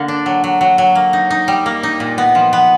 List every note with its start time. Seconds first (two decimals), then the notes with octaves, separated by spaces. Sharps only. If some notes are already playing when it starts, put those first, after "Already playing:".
Already playing: D3 A#3
0.08 D4
0.26 F#3
0.44 F#3
0.61 F#3
0.78 F#3
0.95 A#3
1.13 D#4
1.30 D#4
1.48 G3
1.66 A#3
1.83 D#4
2.00 A#2
2.18 B3
2.35 F3
2.53 B3